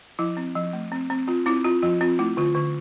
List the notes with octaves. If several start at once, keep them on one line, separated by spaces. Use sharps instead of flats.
F3 E4
C4
F3
A3
C4
C4
C4 F4
C4 E4
C4 F4
F3 F4
C4 F4
A3 E4
D3 F4
D3